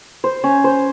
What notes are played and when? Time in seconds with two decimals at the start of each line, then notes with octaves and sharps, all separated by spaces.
0.24 C5
0.44 C#4
0.64 C5